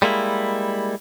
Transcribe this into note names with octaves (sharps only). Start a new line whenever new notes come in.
G3 G#3 A#3 E4